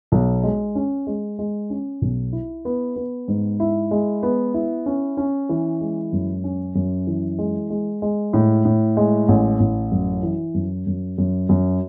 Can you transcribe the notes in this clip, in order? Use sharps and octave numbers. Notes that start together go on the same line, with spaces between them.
B1
G#3
C#4
G#3
G#3
C#4
B1
E4
B3
B3
G#2
E4
G#3
B3
E4
C#4
C#4
E3
G#3
F#2
C#4
F#2
E3
G#3
G#3
G#3
A2
A2
G#3
A1
A1
F#2
E3
F#2
F#2
F#2
F#2